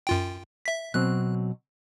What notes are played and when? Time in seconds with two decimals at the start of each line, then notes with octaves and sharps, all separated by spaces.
0.07 F#2 F4 G5
0.66 E5 B6
0.94 B2 F#3 C4 F#6